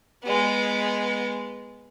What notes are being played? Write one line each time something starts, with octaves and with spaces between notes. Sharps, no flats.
G#3 B3